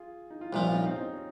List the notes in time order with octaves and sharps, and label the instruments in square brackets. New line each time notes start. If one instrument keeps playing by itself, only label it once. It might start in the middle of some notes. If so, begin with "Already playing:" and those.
Already playing: [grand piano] F4 G#4
D#4
F4
[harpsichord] C2 A#2 F3 [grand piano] D#4 G4
[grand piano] C#4 F4
C4 D#4
C4 D#4
C4 D#4
C#4